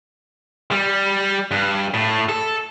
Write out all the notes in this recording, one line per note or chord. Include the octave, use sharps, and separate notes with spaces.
G3
G2
A2
A4